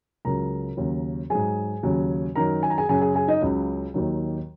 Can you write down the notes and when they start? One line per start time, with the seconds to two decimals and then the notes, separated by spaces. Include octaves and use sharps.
0.25 C#2 C#3 F#3 A#4 A#5
0.77 D#2 C#3 F#3
1.30 G#2 F#3 G#4 G#5
1.83 D#2 C#3 F#3
2.36 F#2 D#3 F#3 A#4 A#5
2.63 G#5
2.70 A#5
2.78 G#4 G#5
2.89 F#2 C#3 F#3 G#4 G#5
3.01 G#4 G#5
3.15 G#4 G#5
3.28 D#4 D#5
3.41 C#2 C#3 F#3
3.94 D#2 D#3 F#3